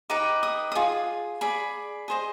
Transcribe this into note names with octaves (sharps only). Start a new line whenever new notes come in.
D#4 G4 B4 D#5 D6
D#6
D#6
F4 G#4
G#4 D5 B5
G#4 C5 D#5